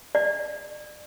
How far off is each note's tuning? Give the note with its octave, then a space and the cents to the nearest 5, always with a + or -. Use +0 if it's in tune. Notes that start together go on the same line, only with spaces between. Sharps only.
D5 +35